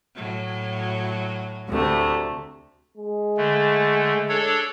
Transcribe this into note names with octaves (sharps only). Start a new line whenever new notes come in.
A2 F#3
D2 C3 A3
G#3
D3 A3
D4 A4 C#5